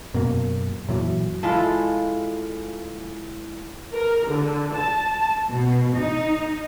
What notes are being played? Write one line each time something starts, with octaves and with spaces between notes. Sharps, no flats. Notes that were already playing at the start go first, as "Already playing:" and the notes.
F#2 B2 A#3
F#2 A#2 E3 F#3
G#3 E4 F4 A4
A#4
D3
A5
B2
D#4